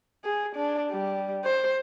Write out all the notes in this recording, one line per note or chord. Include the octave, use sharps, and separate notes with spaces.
G#4
D4
G3
C5